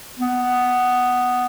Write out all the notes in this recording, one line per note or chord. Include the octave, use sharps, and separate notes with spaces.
B3